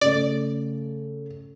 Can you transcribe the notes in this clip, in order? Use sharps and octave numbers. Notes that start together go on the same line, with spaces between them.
C#3 A3 D5